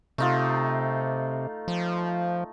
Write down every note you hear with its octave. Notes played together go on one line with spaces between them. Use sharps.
C3 A3 D#4 F4
F3